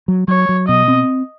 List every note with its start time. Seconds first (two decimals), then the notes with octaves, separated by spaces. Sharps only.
0.08 F#3
0.28 F#3 C#5
0.49 F#3
0.68 B2 D#5
0.88 C4